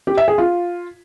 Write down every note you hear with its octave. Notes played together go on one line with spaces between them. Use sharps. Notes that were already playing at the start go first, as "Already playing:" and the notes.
G4
E5
G#4
F4